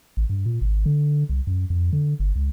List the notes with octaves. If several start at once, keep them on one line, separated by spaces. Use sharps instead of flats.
A1
G2
A#2
G#1
D3
C2
F#2
F2
D3
G1
C#2